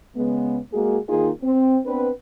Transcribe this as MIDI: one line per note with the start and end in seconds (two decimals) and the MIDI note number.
0.15 0.57 49
0.15 0.57 56
0.15 0.57 59
0.73 0.98 56
0.73 0.98 58
0.73 0.98 66
0.73 0.98 68
1.08 1.29 51
1.08 1.29 58
1.08 1.29 63
1.08 1.29 65
1.08 1.29 68
1.42 1.77 60
1.85 2.10 59
1.85 2.10 60
1.85 2.10 62
1.85 2.10 71